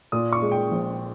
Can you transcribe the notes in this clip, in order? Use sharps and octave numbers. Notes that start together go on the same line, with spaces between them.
A#2 D#6
C#6
G#3
G5
A#1